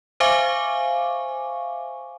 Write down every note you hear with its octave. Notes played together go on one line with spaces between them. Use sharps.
C5 E5 F5 G#5 C#6 D6